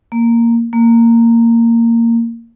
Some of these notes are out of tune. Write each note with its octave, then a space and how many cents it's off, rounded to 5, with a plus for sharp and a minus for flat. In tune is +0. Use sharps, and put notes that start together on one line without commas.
A#3 -5
A#3 -15